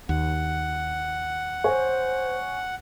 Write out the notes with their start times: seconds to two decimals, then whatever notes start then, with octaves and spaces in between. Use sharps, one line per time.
0.09 D#2 F#5
1.64 C5 C#5 G#5